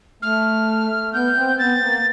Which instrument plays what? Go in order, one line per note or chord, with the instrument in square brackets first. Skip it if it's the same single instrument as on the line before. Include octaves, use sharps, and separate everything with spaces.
[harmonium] A3 [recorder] F6
[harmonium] B3 [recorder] G6
[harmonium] C4
[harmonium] B3 [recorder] A6
[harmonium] A#3